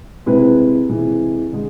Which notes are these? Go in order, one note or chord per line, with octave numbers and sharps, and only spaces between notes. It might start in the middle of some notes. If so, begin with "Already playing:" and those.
C3 G#3 C4 E4 B4
C3 E3 G#3
D3 G#3